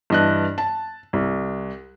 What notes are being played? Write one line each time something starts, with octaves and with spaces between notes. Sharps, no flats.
G2 E3 D#5 A5 F#6
A5
C2